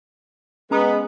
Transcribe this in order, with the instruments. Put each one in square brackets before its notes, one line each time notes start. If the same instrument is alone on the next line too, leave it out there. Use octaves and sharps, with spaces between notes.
[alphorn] G#3 [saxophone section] B3 [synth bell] C#4 A#5 D#6